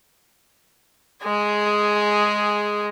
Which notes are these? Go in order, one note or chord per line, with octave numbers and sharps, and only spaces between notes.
G#3 G#4